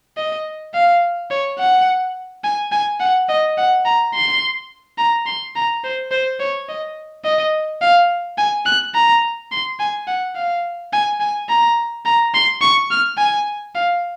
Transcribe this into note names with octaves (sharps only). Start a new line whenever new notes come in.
D#5
F5
C#5
F#5
G#5
G#5
F#5
D#5
F#5
A#5
C6
A#5
C6
A#5
C5
C5
C#5
D#5
D#5
F5
G#5
F#6
A#5
C6
G#5
F#5
F5
G#5
G#5
A#5
A#5
C6
C#6
F6
G#5
F5